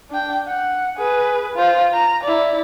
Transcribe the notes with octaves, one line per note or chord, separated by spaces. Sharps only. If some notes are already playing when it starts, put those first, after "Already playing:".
D4 G5
F#5
G#4 B4
F4 C5
A#5
E4 D5